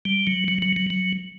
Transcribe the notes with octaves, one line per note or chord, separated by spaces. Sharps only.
G3
F#3
F#3
F#3
F#3
F#3